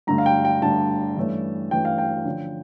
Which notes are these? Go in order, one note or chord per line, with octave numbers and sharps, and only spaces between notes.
G2 D3 A3 A#5
F5
G5
G5
G2 D3 A3 A5
G2 E3 A3 C#4
G2 E3 A3 C#4 G5
F5
G5
D3 F3 C#4